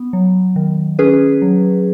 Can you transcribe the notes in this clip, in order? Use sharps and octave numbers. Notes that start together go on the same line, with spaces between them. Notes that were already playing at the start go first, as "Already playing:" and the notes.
Already playing: B3
F#3
D#3
C#4 G#4 B4
F#3